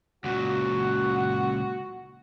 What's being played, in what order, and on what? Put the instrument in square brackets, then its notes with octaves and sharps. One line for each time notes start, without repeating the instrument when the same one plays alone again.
[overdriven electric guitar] C#2 A#2 [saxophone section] F#4